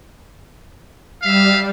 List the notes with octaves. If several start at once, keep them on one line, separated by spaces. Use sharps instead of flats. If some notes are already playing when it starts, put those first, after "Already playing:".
G3 E5 F5